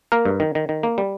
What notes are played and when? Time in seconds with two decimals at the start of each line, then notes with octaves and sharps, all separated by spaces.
0.12 A#3 A#4
0.25 G2
0.40 D#3
0.55 D#3
0.69 D#3
0.83 A#3
0.98 G3